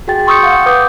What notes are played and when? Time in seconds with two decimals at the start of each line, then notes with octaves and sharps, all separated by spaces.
0.08 F#4 G#4 G5 A6
0.27 C6 C#6 D#6 E6 G6 C#7
0.43 F5 F#5
0.66 B4 D6 D#6 G6